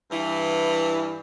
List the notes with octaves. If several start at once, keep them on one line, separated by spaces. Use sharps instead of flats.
G2 E3